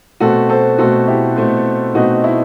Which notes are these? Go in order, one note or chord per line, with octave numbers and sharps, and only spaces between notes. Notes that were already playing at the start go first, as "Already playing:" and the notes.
B2 A3 C4 F#4 A4
A4 C5
B2 A3 C4 F#4 A4
E4 G4
B2 A3 C4
B2 A3 C4 D#4 F#4
E4